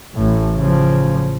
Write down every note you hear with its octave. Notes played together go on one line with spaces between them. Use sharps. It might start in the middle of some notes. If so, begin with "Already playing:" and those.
A1 A2
C#3 F3